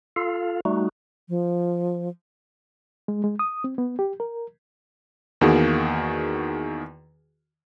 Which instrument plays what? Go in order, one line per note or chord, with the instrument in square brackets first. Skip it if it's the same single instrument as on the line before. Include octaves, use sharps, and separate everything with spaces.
[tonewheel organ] F4 A4 F5
G3 A3 D#4 F#4
[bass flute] F3
[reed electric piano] G#3
G#3
D#6
C4
B3
G4
A#4
[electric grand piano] E2 D#3 A#3 F#4 G#4